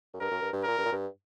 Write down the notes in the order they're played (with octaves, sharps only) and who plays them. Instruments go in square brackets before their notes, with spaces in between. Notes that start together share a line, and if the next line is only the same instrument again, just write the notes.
[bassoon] F#2
[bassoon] G2 [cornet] A#4
[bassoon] F#2
G2
G2
[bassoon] A#2 [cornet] A#4
[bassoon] G2
A#2
G2